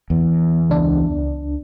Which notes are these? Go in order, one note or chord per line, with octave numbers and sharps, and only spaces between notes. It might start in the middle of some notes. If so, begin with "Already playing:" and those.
E2
C#2 D4